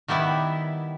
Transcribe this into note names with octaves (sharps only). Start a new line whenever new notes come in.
D#3 G3 B3 E4